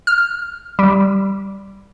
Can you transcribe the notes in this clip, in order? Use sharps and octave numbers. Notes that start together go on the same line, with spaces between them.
F6
G3